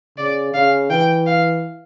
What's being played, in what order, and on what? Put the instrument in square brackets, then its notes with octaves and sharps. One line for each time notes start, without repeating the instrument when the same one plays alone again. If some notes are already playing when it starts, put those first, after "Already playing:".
[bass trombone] C#3 [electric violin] D5
[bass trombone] C#3 [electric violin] F5
[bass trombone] E3 [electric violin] G5
[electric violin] F5